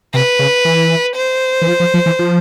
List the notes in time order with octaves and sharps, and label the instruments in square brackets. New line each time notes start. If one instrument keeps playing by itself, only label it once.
[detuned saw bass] C3 [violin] B4
[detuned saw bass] C#3
E3
[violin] C5
[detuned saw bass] E3
F3
F3
F3
E3
F3